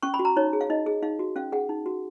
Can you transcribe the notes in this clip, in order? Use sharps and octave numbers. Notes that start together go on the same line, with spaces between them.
C#4 C#6
B5
F#4
A#5
D#4 C#5
G#4
F5
D#4 D#5
G#4
D#4 F5
F#4
C#4 F5
G#4 F#5
D#4
F#4